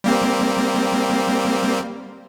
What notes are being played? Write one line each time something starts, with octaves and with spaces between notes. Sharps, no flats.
G3 A#3 C4